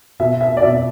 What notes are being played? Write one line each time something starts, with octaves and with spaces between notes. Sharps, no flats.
B2 E5
E5
D5
B2 E5